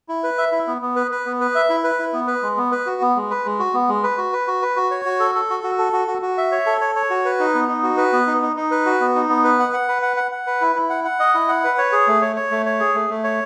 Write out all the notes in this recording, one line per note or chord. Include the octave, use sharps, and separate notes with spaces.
E4
B4
E5
E4
B3
B3
B4
B4
B3
B4
E5
E4
B4
E4
B3
B4
G#3
B3
B4
F#4
B3
G#3
B4
G#3
F#4
B3
G#3
B4
F#4
B4
F#4
B4
F#4
C#5
F#4
A4
A4
F#4
F#4
A4
F#4
F#4
F#4
E5
C#5
A4
C#5
C#5
F#4
B4
D#4
B3
D#4
F#4
B4
B3
D#4
D#4
D#4
B4
F#4
B3
D#4
B3
B4
F#5
F#5
B4
F#5
F#5
F#5
B4
E4
E4
F#5
F#5
D#5
E4
F#5
B4
C#5
G#4
A3
C#5
C#5
A3
C#5
G#4
A3
A3
C#5